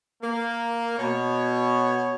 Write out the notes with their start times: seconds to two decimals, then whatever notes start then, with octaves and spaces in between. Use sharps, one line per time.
0.22 A#3
0.98 B2 C#5